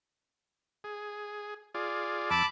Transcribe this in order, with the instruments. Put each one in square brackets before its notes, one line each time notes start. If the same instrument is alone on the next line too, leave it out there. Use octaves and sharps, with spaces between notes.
[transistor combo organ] G#4
F4 G#4 D5
[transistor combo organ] F2 E6 [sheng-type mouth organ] A5 B5 D6